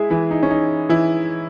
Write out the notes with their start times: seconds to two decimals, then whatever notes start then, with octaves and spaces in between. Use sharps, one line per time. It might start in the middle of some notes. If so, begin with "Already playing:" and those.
Already playing: G#3 E4 G#4 E5
0.10 E3 E4
0.31 D#4
0.43 C#4
0.50 D#4
0.89 E3 E4